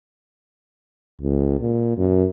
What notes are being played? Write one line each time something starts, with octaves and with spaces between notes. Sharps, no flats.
C#2
A#2
F#2